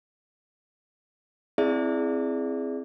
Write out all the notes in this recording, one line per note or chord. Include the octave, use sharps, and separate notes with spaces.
C4 E4 G#4 D5 E5